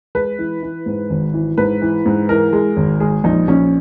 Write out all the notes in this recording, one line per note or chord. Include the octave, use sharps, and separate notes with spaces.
G#3 B4
E3
E3
G#2
G#1
E3
G#2 B4
E3
G#2
E3 A#4
G#3
G#1
G#3 G#4
A#1 D#4
A#1 C#4